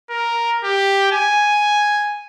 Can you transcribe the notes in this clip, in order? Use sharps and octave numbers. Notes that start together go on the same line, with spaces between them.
A#4
G4
G#5